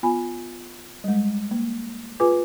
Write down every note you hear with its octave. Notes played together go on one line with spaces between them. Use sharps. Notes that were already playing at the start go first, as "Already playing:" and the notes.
B3 F4 G#5 B5
G3 G#3
A#3
F4 G#4 B4 G#5 D6